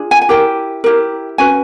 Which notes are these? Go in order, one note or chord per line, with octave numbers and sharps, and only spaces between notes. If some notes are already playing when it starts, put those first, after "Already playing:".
Already playing: D4 F4 G#4
G#5
G#5
E4 G4 A#4 G5
E4 G4 A#4
C#4 F#4 B4 G#5